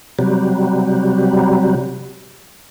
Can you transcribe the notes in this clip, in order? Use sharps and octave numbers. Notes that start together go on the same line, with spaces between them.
C3 F#3 G3